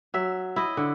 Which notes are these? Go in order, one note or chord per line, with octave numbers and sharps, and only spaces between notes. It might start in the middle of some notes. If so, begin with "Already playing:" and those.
F#3 E5
E4 D#5
D3